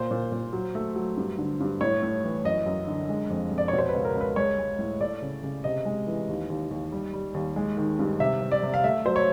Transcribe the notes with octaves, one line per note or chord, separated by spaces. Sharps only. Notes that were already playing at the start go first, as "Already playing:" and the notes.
Already playing: A#2 C5
A#2
A#2
F#3
A3
F#3
G2
D3
G2
A2 C#5
A2
E3
F#2 D#5
F#2
D3
G#3
F2
F2
D5
B2 C#5
C5
B4
C#2
A#4
C#2
B4
G#3 C#5
G#3
A2
A3 D5
C#3
C#3
C3 D#5
G#3
E3
D#2
D#2
D#2
G3
G3
D#2
G#3
D#3
G2
C3 E5
C3
D5
C3
F5
A3 E5
F#3 C5
C#5